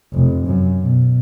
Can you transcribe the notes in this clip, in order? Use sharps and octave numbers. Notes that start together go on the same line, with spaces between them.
F1
F#2
B2